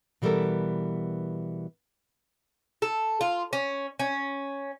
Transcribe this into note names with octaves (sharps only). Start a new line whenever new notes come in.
B2 E3 G3 B3 A4 A#4
A4
F4
C#4
C#4